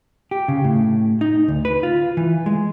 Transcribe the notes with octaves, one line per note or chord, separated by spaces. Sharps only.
G4
C#3
A2
D#4
D2
B4
F4
E3
G#3